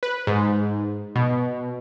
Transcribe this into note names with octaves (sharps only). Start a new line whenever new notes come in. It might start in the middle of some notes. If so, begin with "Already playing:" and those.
B4
G#2
B2